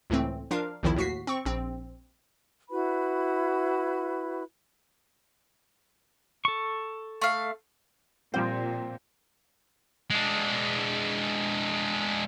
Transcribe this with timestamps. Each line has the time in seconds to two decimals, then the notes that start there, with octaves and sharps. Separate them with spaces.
0.10 C#2 A2 E3 A3 C4
0.51 F3 D4 F4 A#4 F5
0.83 B1 E2 D#3 F3 E4
0.96 D#2 A2 F#4 B6 C7
1.27 C4 C#6
1.45 A#1 C4
2.70 E4 F#4 B4 B5
6.45 A4 C#6
7.22 A3 F5
8.34 A#2 F3 G3 C4 C5 G5
10.10 G#3 D4